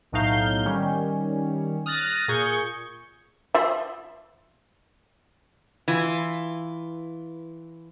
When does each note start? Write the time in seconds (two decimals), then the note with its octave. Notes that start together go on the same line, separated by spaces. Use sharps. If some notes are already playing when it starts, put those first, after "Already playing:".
0.12 B1 A2 F#3 D#4 F5 G6
0.66 D#3 G3 C#4
1.86 D#6 F6 F#6 A6 A#6
2.28 A#2 G#4 C#6 G6 G#6
3.55 F3 F4 E5
5.88 E3 F4